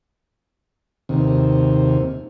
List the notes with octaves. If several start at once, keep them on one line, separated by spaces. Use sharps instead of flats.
D#2 C3